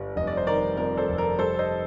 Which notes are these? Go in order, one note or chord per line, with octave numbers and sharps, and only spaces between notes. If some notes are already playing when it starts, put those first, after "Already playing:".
Already playing: G1 G3
F1 D#5
D5
C5
D#3 A#4 D5
F2 A#4
A4 C5
F1
A#4
G3 A4 C5
C5 D#5